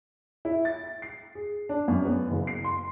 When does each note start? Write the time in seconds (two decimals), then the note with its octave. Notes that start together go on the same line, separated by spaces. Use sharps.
0.45 E4
0.65 A6
1.02 C7
1.35 G#4
1.69 D4
1.88 F#2
2.05 B3
2.30 F#1
2.47 C7
2.64 C6